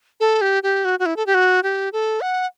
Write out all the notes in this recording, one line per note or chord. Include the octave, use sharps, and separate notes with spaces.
A4
G4
G4
F#4
F#4
E4
A4
G4
F#4
G4
A4
F#5